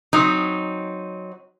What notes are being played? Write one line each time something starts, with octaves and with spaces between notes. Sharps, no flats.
F#3 C4 D#4